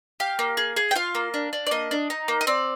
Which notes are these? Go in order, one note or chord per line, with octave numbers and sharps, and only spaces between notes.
G4 F5
A#3
G#4
G#4
G5
F4 F5
A#3
D4
D4
D5
A#3 D#5
D4
D#4
A#3
D#5
C4 D5